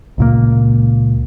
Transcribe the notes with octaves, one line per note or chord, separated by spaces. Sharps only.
C#2 A#2 A#3